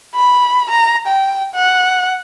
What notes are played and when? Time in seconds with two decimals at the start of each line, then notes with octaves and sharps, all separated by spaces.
0.15 B5
0.70 A#5
1.07 G5
1.54 F#5